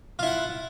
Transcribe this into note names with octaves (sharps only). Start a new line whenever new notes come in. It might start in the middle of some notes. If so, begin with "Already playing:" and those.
E4 F4 F#5